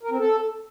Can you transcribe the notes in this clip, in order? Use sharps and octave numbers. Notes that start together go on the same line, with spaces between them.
A#4
C4
A4